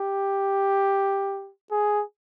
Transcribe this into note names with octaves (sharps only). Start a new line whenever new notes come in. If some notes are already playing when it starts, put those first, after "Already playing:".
Already playing: G4
G#4